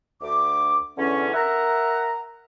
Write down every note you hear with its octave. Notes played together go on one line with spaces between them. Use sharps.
D2 D6
E2 D3 C#4
A#4 E5 F#5 A#5